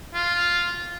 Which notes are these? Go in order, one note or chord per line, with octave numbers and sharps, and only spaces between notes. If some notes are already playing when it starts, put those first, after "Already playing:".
F4